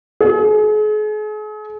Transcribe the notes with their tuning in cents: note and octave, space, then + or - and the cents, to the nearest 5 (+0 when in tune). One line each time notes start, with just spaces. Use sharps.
G#4 +40